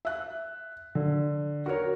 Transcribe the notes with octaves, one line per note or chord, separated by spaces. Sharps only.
E5 F#6
D3
F#4 A#4 C#5